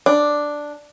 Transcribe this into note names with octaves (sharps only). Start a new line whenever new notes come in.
D4